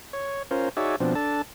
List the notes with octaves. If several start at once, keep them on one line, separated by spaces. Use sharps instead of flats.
C#5
C#4 F4 A#4 C5
D#4 F#4 G#4 C#5 D5 E5
B2 F3 C4 D4
D4 A4 A5